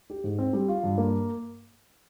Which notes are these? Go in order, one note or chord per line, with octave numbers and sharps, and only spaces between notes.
G4
G#2
C4
G3
F4
G2
A#3